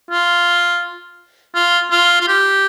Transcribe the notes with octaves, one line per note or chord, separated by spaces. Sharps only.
F4
F4
F4
F4
G4